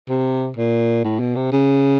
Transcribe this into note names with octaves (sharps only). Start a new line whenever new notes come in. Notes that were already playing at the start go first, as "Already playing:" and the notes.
C3
A#2
A2
B2
C3
C#3